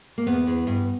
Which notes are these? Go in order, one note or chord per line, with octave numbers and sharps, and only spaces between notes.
A#3
E2 B3
E2
G2